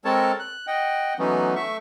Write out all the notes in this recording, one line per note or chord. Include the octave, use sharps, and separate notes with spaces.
G#3 C4 A4 A#4 C#5 A5
F#6
D#5 F#5 G5
E3 F#3 A3 B3 C#4 D#4
A3 E5 C#6